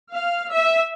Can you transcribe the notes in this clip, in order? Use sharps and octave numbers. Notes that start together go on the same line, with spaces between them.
F5
E5